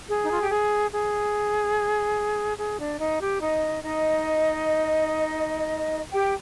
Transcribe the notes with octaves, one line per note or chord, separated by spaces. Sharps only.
G#4
D#4
F4
G4
G#4
G#4
G#4
D4
D#4
G4
D#4 D#5
D#4 D#5
G4 G5